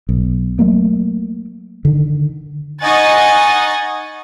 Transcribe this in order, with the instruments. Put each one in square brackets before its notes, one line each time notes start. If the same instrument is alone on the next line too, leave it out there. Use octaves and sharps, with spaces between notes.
[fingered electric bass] B1
F#3 A3 A#3
D3 D#3
[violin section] D#4 D#5 F#5 G#5 C#6 A6